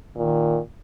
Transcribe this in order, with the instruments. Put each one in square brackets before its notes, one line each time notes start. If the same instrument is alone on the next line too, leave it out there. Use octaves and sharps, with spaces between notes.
[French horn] A#2 [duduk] D#3